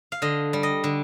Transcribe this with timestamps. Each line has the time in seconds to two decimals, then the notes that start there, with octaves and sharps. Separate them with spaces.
0.12 F5
0.22 D3 D#5
0.53 G3
0.63 D#5
0.84 D3